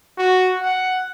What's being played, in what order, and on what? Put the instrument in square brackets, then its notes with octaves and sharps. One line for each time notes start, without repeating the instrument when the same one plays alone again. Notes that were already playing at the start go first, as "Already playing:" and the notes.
[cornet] F#4
F#5